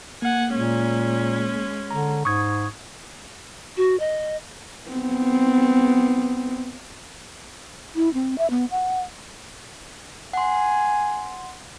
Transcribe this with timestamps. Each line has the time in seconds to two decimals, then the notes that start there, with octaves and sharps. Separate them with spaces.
0.22 A#3 F#5 G#5
0.54 A#2 G#3 C#4
1.91 D3 A#5
2.25 G#2 C#6 D#6 G#6
3.77 F#4
4.00 D#5
4.90 B3 C4
7.95 E4
8.14 C4
8.38 E5
8.50 B3
8.71 F#5
10.33 F#5 G#5 C6